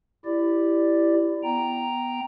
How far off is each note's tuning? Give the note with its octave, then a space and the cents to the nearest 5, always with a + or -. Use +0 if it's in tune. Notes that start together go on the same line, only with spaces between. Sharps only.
E4 +15 G4 +0 D5 +0
B3 +0 G5 +0 A#5 +0